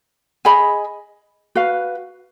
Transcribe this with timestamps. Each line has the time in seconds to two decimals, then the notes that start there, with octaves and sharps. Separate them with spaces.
0.45 G#4 D#5 G#5 B5
1.55 F#4 B4 F5